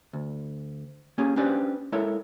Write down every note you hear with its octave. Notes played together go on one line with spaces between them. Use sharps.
D2
A#3 C#4 G4 G#4
C#4 D4 G4 B4 C5 D5
G#3 E4 A4 A#4 C#5 E5